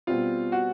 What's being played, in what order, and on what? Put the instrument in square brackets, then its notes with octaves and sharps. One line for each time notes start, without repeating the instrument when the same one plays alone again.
[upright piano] B2 G3 C4 [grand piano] F4
[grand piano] F#4